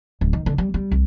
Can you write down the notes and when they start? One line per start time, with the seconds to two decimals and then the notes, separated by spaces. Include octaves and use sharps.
0.21 D1
0.33 D#3
0.46 D3
0.58 G3
0.74 G3
0.91 C2